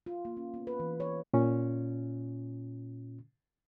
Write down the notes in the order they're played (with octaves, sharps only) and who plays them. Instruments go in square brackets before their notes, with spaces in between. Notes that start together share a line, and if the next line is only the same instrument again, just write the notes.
[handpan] F4
A#3
C#4
B3
B4
E3
C#5
[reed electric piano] A#2 C#4 F4